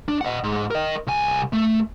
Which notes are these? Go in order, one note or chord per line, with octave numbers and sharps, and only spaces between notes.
D4
D#5 F#5
G#2
A#4 D#5
C2 G#5
A3